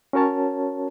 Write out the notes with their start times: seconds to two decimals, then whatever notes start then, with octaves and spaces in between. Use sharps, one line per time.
0.13 C#4 F#4 A#4 C#5 A5